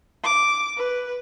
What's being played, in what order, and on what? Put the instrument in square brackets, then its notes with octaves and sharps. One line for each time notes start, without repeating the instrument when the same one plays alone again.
[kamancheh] D6
B4